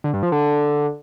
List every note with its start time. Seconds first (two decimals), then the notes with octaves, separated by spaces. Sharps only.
0.04 D3
0.13 G2
0.23 F3
0.32 D3